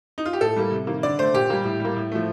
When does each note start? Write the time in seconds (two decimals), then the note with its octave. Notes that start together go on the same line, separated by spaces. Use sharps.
0.18 D#4
0.26 F4
0.33 G4
0.41 A2 A4
0.56 G3 A#3
0.71 C3
0.87 D#3 A#3
1.03 D3 D5
1.19 A3 C5
1.34 A#2 G4
1.50 G3 A#3
1.65 A2
1.80 G3 A#3
1.96 A2
2.12 F3 A3